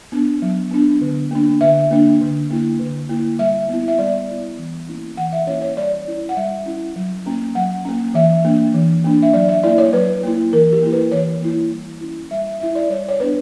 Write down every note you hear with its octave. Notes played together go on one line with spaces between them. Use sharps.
B3 D4
F#3
B3 D4
D3
A#3 D4
D3 E5
A#3 D4
D3
A#3 E4
D3
A#3 E4
G3 E5
B3 E4
E5
G3 D5
B3 E4
E3
A#3 C#4 E4
E3 F#5
E5
A#3 C#4 E4 C#5
C#5
G3 D5
C#4 E4
F#5
G3 E5
C#4 E4
F#3
A#3 C#4
F#3 F#5
A#3 C#4
E3 E5
A#3 D4
E3
A#3 D4
E5
F#3 D5
E5
A#3 E4 D5
C#5
F#3 B4
A#3 E4
E3 A#4
G4
A#3 E4
B4
E3 C#5
A#3 E4
G3
C#4 E4
G3 E5
E5
C#4 E4 E5
D5
G3 C#5
C#5
B3 D4 B4